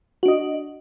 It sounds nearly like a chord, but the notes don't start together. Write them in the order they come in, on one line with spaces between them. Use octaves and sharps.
F#4 D4 D#5